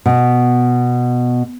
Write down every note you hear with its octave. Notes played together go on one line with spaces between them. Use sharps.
B2